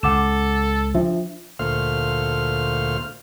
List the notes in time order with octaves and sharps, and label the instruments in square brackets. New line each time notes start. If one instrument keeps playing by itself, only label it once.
[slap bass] C#2 [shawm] A4 [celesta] F#5 D6 E7
[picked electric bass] F3 [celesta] D4 E5
[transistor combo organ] D2 A#2 A3 C5 F5 F6